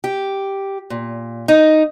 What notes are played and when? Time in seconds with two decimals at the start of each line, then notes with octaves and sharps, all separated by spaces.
0.04 G4
0.90 A#2
1.48 D#4